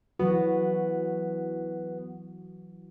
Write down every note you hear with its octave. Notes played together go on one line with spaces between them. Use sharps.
E3 F#3 B3 F#4